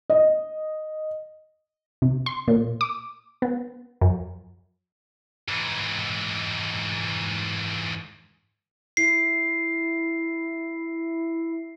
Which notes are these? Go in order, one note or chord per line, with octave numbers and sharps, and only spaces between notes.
D#5
C3
C6
A#2
D6
B3
F#2
G#2 E3
E4 C7